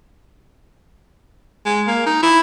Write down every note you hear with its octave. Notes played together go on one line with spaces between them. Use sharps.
G#3
A#3
D#4
E4